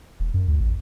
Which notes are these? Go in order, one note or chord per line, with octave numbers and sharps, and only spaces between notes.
E1
F#2
D2
A1